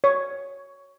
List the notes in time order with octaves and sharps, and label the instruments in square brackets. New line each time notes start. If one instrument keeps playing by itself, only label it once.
[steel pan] C#5